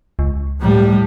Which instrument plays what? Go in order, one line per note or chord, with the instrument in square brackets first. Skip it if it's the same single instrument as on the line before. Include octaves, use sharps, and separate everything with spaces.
[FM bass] C#2
[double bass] A2 G3